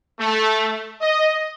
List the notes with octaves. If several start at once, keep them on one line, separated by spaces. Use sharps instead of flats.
A3
D#5